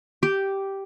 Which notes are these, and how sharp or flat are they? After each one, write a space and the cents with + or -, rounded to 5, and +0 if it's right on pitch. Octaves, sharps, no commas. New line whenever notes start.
G4 -5